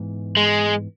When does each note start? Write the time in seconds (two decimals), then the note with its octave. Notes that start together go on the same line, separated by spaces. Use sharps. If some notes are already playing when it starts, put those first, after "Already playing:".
Already playing: G#2 E3 B3
0.37 G#3